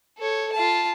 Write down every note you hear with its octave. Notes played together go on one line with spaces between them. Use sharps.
A4 C#5
F4 A5